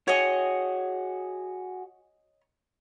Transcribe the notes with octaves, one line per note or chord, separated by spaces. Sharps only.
F#4 G#4 C#5 D#5